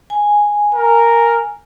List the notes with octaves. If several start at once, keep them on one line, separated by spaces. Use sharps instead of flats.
G#5
A#4